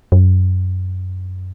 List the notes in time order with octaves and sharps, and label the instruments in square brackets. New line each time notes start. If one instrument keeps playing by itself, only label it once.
[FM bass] F#2